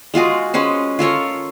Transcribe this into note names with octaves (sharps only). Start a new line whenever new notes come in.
G#3 F4 F#4 G#4
G#3 C#4 B4 C5
F4 A4 A#4 C#5